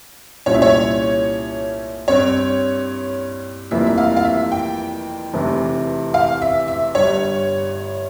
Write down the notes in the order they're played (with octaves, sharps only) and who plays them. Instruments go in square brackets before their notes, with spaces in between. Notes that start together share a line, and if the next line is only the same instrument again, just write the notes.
[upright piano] C2 A#2 G3 C#4 F4 [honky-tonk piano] C#5
[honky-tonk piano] E5
C#5
[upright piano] G2 G3 C4 [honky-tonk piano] C#5
[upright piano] F1 F2 E3 G3 A#3 [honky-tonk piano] E5
[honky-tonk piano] E5
F5
F5
E5
G5
[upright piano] F1 E2 C3 E3
[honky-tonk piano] F5
E5
E5
[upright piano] G1 G2 G3 [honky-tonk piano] C#5